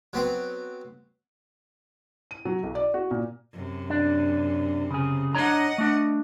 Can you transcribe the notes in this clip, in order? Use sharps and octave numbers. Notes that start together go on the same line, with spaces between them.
F#3 B3 C4
D#7
F#3
B1
D5
F#4
A#2
F#2 C3
D4
C#3 G#4
D4 C#5 D#5 F#5 A#5
A3 D4